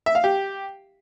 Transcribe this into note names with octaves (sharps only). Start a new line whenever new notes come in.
E5
F5
G4